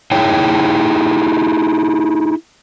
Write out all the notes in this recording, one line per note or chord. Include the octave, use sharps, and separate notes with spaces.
D#4 E4 G#4 C#5 G5